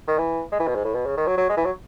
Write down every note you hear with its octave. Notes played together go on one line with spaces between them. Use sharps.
D#3
E3
G#3
E3
B2
G#2
A2
B2
C#3
D#3
F#3
F#3
G#3
E3
F#3